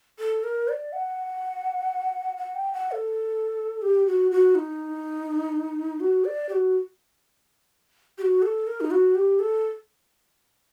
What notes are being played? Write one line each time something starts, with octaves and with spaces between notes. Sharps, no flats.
A4
A#4
D5
F#5
F#5
G5
F#5
A4
G4
F#4
F#4
D#4
F#4
D5
G4
F#4
G4
F#4
A4
A#4
D#4
F#4
G4
A4